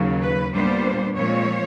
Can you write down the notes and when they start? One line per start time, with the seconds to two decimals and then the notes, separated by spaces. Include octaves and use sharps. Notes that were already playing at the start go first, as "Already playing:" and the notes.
Already playing: D#2 C#3 F#3
0.22 B4
0.53 A#2 G3 B3 D4 C5
1.15 A#2 F3 G#3 C4 C#5